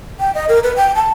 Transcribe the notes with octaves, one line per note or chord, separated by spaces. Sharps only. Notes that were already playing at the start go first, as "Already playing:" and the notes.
G5
D#5
A#4
B4
G5
A5